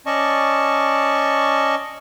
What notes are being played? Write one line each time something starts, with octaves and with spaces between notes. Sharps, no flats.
C#4 D5 D#5 A5 C#6